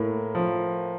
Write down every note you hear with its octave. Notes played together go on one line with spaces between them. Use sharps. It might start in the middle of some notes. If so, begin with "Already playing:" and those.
Already playing: A2 A#3 A#4
F3